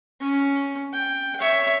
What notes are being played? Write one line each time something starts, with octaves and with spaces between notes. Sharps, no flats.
C#4
G5
C#5 E5